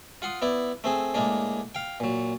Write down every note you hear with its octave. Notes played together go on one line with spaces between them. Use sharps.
F4 F#5 C6 D#6
B3 E4 D5
A3 C4 G#4
A2 G#3 A#3 D4
F5 G5
A#2 F#3